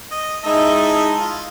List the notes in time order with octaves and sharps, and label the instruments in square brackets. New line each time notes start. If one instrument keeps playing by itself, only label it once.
[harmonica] D#5
[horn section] G#3 D#4 A5 [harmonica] E4 D#5 E5
[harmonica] F4